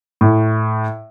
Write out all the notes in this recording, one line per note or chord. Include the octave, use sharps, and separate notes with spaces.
A2